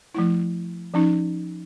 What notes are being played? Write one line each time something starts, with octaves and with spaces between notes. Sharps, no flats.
F3 A3 E4
F3 C#4 D#4